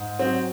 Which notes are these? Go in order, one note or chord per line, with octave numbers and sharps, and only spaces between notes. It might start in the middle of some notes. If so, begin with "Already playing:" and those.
Already playing: G#2
F#3 C4